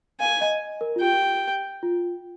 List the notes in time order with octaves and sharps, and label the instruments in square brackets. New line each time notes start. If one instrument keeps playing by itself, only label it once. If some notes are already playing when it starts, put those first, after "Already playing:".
[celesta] F5 [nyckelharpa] G#5
[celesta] D#5
A#4
F4
[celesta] G4 [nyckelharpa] G5
[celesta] F4